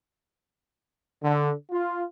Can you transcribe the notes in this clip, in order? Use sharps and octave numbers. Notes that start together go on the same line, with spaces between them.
D3
F4